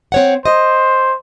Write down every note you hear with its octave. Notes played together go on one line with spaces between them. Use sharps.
C4 C#5 F#5
C5 D#5